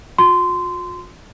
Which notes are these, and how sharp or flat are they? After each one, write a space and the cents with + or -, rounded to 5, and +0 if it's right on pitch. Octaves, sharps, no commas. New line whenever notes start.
F4 +45 C6 -15